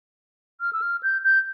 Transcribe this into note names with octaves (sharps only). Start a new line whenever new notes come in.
F6
E6
F6
G6
G6